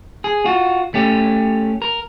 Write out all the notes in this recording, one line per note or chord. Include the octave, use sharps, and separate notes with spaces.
G#4
F4 F#4
A3 C#4 G4
A#4